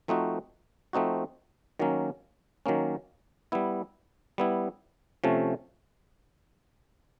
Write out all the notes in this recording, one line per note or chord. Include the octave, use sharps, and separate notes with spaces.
F3 A3 C4 D#4 F#4
F3 A3 C4 D#4 F#4
D#3 F#3 A#3 C#4
D#3 F#3 A#3 C#4
G3 B3 E4
G3 B3 E4
C3 F3 A3 C#4